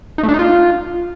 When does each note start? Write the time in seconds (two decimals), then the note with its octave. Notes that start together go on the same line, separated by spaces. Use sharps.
0.18 D#4
0.23 A3
0.29 D4
0.34 D#4
0.39 F4